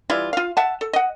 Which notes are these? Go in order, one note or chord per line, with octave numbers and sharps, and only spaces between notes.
E3 G3 E4 F4
F4 F5
E5 F#5 A5
A4
D#5 F#5